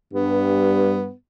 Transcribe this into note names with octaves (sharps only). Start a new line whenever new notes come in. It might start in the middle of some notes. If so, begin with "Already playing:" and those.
G2 B3